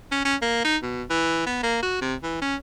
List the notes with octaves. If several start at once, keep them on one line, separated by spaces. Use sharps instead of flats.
C#4
C#4
A#3
D#4
B2
E3
B3
A#3
F#4
C3
E3
C#4